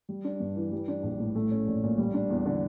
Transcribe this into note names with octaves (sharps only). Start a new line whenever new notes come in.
G3
D4
G2
E3
G3
D4
A#1
A2
A3
C#4
A#1
A#2
G3
D4
E2
D3